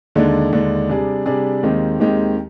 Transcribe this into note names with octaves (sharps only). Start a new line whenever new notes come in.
D#2 D3 G#3 D4
D#2 D3 G#3 D4
C3 G3 D4 G#4 D5
C3 G3 D4 G#4 D5
D#2 D#3 G#3 C4 G4
D#2 D#3 G#3 C4 G4